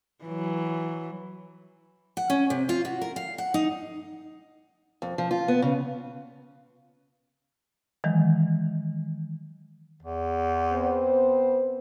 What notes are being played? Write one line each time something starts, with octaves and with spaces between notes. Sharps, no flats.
E3 F#3
F#5
C#4
C3
F4
F#4
A#4
F5
F#5
D#4
F2
F3
F4
B3
C#3
D#3 E3 F#3 G#3
E2
B3 C4 C5